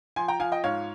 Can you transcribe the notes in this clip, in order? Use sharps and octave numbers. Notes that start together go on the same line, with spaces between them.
F3 G#5 C6
G5 A#5
F3 F5 G#5
D#5 G5
G#2 C#5 F5